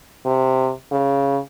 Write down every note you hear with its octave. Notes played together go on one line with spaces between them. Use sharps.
C3
C#3